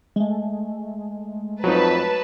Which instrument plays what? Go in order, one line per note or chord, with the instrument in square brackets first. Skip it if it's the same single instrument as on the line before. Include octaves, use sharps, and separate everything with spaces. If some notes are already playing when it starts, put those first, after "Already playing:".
[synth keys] G#3 A3
[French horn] F2 [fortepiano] F#3 D#4 [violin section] B4 A5